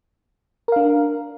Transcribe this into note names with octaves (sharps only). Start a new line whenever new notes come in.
D4 A#4 F5